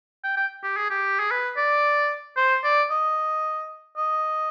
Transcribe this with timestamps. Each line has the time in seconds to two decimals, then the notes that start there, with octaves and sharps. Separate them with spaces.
0.24 G5
0.37 G5
0.63 G4
0.77 G#4
0.90 G4
1.19 G#4
1.31 B4
1.57 D5
2.37 C5
2.64 D5
2.90 D#5
3.97 D#5